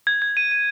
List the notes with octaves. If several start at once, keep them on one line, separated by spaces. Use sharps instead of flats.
G#6
G#6
D#7
D#7